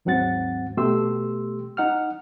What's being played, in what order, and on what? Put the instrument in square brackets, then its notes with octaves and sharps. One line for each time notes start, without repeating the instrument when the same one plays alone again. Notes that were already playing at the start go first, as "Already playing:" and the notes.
[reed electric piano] D#2 G#2 F#3 C4 F#5 A6
B2 A3 G4 C6 E6
D#4 F#5 F6